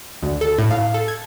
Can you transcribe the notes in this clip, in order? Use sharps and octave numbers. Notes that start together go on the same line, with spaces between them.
D2
A4
A2
F5
A4
G#6